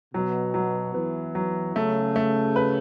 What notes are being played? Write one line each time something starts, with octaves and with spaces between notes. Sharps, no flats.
B2 F#3
F#3
E3 B3
F#3
C#3 A3
A3
B4